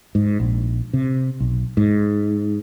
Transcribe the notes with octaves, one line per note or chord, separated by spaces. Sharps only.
G#2
A#1
C3
B1
G#2